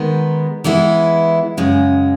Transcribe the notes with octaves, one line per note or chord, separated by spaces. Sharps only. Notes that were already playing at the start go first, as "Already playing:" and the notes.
Already playing: D#3 G#3 B3
E3 G#3 B3 E4
F#2 C#3 G#3